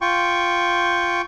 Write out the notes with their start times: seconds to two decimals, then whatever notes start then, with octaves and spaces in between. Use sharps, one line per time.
0.01 F4 G5 C#6